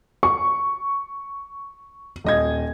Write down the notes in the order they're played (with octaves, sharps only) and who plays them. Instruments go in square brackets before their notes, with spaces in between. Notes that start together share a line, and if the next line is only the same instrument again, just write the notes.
[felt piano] C#6
[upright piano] D#1 D#5 G#6